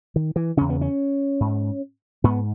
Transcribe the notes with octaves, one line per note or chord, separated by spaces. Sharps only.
D#3
E3
E2 C#3 C#4
B3
C#4
G#2
G#2 B3